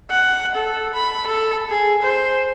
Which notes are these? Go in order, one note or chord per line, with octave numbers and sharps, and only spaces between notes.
F#5
A4
B5
A4
G#4
C5